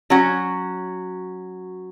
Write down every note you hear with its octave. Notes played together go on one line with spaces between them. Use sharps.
F#3 C#4 F#4